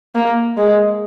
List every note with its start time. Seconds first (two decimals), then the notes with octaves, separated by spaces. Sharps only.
0.15 A#3
0.57 G#3